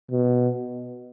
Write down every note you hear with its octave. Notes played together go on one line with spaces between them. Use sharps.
B2